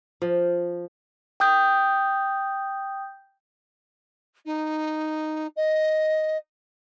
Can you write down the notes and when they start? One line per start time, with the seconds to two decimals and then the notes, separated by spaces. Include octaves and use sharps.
0.22 F3
1.40 G5 D#6 G6
4.45 D#4
5.56 D#5